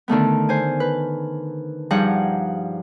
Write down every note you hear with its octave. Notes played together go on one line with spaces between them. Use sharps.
D3 D#3 A3 B3
C5 G#5
B4
G2 F3 G3 D#4 G#4 F#5